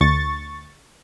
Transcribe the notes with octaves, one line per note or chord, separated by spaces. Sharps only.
D2 C#6 A6